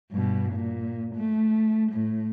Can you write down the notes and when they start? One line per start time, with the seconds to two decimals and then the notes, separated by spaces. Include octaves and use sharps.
0.12 G2 B2
0.53 A#2
1.15 A3
1.92 A2